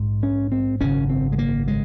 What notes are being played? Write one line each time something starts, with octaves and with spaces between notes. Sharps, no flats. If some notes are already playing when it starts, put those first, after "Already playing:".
Already playing: A#1 G#2
C#4
C4
G#1 F#2 C#3 C#4
C4
G#3
A#3
G#3